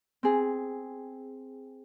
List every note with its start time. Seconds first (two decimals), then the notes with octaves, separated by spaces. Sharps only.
0.23 C4 G#4